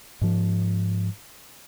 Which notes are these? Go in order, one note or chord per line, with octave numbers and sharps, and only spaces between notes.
G#2 F3